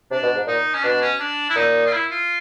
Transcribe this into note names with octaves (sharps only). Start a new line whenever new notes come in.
C3 D4
B2
G#2
A#2 D#4
C#4
B2 D4
C#4
D4
E4
A#2 D#4
F4
E4
F4